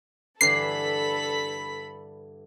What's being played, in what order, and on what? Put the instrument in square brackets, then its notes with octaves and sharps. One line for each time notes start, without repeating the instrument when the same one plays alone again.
[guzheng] G2 D3 E3 [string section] A4 B5 B6 [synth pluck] C7